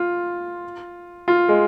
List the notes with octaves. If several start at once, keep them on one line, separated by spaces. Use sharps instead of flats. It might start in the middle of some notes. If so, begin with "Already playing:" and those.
Already playing: F4
F4
G#3